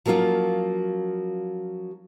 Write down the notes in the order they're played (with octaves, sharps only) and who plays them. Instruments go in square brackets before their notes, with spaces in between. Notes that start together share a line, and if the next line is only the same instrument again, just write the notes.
[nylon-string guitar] F3 F#3 A#3 C#4 F4 F#4